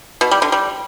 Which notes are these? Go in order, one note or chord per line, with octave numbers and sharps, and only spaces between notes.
B2
G3
D3
G3